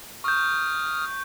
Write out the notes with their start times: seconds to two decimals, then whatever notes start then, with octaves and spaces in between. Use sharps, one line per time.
0.24 C#6 D#6 F6 G6